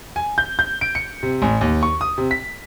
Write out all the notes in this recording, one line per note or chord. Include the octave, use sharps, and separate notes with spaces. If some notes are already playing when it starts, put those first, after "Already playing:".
G#5
G6
G6
D7
C#7
C3
A1
D#2
C#6
D#6
C3
B6